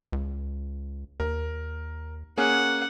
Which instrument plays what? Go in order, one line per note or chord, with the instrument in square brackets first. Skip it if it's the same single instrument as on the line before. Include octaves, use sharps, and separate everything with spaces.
[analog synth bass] C#2
[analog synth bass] D#2 [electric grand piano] A#4
[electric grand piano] A#3 C#4 G#4 [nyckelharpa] F#5